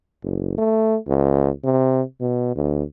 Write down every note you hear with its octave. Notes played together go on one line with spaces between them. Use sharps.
F#1
A3
C#2
C3
B2
D2